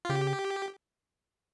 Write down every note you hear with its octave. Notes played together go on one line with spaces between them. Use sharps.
F4
C#3 G4